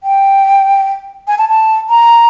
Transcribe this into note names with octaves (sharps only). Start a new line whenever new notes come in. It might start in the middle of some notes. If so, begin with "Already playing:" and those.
G5
G#5
A5
A5
A#5